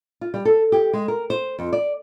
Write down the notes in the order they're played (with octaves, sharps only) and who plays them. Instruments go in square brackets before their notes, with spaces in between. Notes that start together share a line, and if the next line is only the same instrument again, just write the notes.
[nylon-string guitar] F4
G3
A4
G4
G#3
A#4
C5
F2
D5